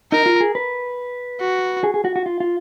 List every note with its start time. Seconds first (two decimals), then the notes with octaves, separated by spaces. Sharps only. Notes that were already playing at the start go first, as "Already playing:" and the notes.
0.12 D#4 A#4
0.26 F4
0.40 G#4
0.55 B4
1.40 F#4
1.84 G#4
1.94 G#4
2.05 F#4
2.16 F#4
2.26 F4
2.40 F4